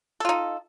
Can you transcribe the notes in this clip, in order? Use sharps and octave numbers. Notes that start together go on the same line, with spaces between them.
D#4 F4 A4